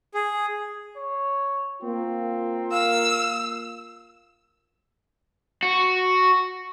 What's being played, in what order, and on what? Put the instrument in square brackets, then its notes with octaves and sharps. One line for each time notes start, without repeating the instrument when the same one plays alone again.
[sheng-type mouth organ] G#4
[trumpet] C#5
[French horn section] A#3 F4 [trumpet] C4
[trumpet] F5 [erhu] E6
[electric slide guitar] F#4